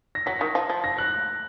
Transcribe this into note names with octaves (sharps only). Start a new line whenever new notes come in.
A#6
F#3 B6
D#3
F3
F3
A#6
F#6